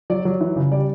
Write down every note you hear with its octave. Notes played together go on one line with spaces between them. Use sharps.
F#3 D5
F#3
E3
C#3
G3 D5